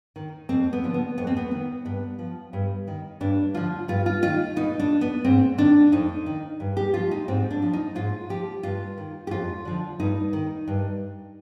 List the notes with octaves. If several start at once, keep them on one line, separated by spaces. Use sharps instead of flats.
D#3
F2 C4
B3
D3 F3
B3
F2 B3
C4
B3
D#3
G2 B3
F3
G2
D#3
G2 D4
D3 F3 F4
G2 F4
F4
D#3 F4
B2 D#4
D4
B3
G#2 C4
D#3 D4
F2 D#4
D#3
G2
G4
F3 F4
D#4
G#2 C4
D4
F3
D#4
G#2 F4
F3 G4
G2 F4
D#3
G4
F2 F4
D3 F3
G2 D#4
D#3
G2